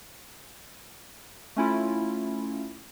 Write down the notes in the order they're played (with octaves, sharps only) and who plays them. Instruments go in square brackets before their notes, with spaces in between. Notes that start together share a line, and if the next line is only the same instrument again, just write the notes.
[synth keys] A3 C#4 E4 F4